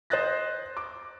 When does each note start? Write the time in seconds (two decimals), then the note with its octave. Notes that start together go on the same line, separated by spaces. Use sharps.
0.10 C5 D#5 D#6 F#6 A6 A#6
0.77 D6